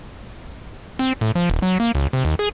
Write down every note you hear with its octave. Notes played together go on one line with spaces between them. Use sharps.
C4
A2
F3
D#1
F#3
A#3
C#2
C3
D#2
G#4